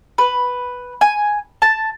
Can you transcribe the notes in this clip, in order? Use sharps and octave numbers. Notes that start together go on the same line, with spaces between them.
B4
G#5
A5